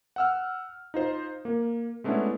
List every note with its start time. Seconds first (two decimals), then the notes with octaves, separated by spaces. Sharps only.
0.16 F#5 E6 F6
0.94 D#4 F4 C5
1.45 A#3
2.04 G#3 A3 B3 C#4 D4 E4